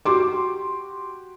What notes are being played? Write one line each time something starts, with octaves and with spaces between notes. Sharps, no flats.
F#4 G4 C6 D6